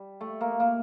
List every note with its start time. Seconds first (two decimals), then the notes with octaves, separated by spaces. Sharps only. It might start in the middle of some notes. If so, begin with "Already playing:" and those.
Already playing: G3
0.21 A3
0.41 A#3
0.60 A#3